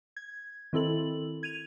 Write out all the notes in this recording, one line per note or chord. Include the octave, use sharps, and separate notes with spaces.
G#6
D#3 C4 E4 A4 F#7
G#6 D#7 F7